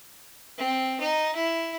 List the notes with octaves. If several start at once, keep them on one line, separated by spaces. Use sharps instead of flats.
C4
D#4
E4